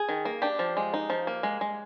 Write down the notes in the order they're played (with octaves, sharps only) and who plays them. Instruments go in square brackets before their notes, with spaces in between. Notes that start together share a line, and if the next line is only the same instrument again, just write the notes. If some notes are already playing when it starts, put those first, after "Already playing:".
Already playing: [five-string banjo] G#4
D#3
A#3
D4 G4
F3
G#3
D#4
F3
A#3
G#3
G#3